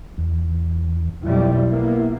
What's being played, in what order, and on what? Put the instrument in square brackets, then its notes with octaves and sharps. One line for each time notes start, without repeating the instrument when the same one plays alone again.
[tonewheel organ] E2
[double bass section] B1 F2 G3 [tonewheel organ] E4
[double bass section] A#3 B3